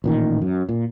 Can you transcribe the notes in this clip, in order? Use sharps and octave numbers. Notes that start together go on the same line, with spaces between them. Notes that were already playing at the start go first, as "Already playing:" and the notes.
A1 A#2 D#3
F#2
A#2